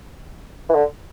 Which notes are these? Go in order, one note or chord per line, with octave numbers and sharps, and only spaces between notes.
E3
D3